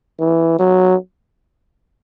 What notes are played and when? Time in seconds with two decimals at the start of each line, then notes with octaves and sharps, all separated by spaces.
0.19 E3
0.59 F#3